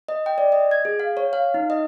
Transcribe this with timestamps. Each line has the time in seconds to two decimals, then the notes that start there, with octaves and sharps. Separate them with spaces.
0.08 D#5
0.26 G5
0.38 D5
0.52 D#5
0.71 G#6
0.85 G#4
1.00 F5
1.17 C#5
1.33 F5
1.54 D#4
1.70 D#5